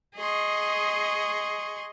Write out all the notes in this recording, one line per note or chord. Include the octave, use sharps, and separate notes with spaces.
G#4 D#5 C6 C#6